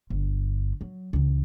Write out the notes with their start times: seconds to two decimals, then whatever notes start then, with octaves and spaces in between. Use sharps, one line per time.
0.10 G1
0.81 F#3
1.13 C#2 E3